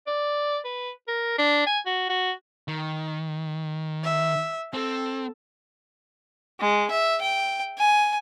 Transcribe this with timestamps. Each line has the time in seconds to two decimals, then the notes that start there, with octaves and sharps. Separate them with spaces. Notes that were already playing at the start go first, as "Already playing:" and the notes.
0.07 D5
0.65 B4
1.08 A#4
1.39 D4
1.66 G#5
1.86 F#4
2.09 F#4
2.68 D#3
4.04 E5
4.74 C4 A4
6.60 G#3
6.91 E5
7.22 G5
7.78 G#5